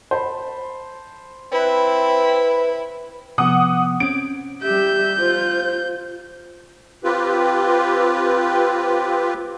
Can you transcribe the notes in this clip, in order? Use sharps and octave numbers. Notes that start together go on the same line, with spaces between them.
C5 A5 B5
C4 E4 B4
C3 F3 B3 F#5 D6 D#6
C4 C#4 D7
G3 G4 E5 G6
F4 C5
C4 F4 G4 B4